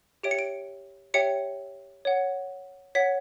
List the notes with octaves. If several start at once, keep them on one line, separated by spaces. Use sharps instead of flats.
G4 C#5 E5 G5 D7
C#7
D7
G4 C#5 E5 G5 C#7
C#5 F#5
C#5 F#5 B6